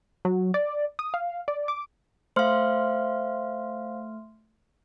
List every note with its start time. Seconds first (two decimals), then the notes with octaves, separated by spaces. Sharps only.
0.25 F#3
0.54 D5
0.99 D#6
1.14 F5
1.48 D5
1.68 D6
2.36 A3 C5 F5 C6 F6